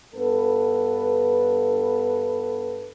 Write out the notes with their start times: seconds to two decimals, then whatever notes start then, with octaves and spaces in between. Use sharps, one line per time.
0.14 G2 B3 A4 B4